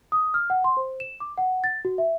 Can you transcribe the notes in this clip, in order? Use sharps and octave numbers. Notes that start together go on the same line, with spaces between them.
D#6
F6
F#5
C6
C5
E7
D6
F#5
A6
F#4
E5